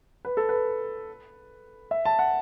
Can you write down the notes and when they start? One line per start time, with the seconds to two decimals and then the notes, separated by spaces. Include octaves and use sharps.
0.25 B4
0.37 A4
0.49 B4
1.91 E5
2.05 A5
2.19 F#5